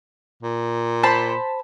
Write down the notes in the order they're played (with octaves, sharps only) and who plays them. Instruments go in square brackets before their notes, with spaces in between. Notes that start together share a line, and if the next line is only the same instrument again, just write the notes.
[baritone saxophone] A#2
[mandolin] C5 A5 B5